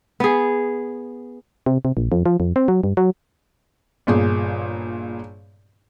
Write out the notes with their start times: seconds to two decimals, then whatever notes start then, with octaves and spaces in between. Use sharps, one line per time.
0.20 B3 G#4
1.66 C3
1.85 C3
1.97 A#1
2.12 F2
2.26 F3
2.40 F2
2.56 C4
2.68 F#3
2.84 G2
2.97 F#3
4.07 G1 A#2 G#4